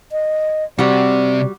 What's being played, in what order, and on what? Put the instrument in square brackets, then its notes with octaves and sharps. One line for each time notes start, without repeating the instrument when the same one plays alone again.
[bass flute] D#5
[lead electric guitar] C3 C4 [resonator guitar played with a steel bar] G3 F#4 [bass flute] D5